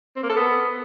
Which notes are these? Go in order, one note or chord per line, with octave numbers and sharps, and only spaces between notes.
C4
A#3
A4
B3